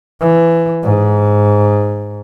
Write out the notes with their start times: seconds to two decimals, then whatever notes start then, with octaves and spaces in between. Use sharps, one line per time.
0.20 E3
0.83 G#2